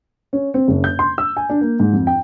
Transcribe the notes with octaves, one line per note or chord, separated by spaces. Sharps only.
C#4
C4
F#1
G6
C6
E6
G#5
D4
A#3
G#2
F2
G5